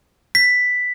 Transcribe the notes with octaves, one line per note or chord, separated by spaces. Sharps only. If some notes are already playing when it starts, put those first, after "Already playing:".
B6